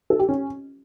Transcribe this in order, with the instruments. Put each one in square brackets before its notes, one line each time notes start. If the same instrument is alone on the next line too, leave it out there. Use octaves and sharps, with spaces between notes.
[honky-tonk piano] A4
G4
C#4